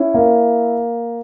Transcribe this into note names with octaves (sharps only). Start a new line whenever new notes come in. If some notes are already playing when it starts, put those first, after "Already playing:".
Already playing: C#4 E4
A#3